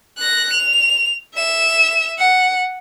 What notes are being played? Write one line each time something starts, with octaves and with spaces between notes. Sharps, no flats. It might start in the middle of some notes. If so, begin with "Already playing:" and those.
F#6 A#6
F7
E5 E7
F#5